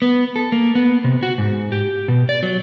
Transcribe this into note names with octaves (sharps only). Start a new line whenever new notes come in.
B3
A4
A#3
B3
C3
F#4
G#2
G4
B2
D5
F#3